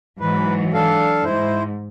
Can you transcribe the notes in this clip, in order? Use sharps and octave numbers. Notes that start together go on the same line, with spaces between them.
G#2 E3 F#3 B4
D4 A4 F5
G#2 E4 C5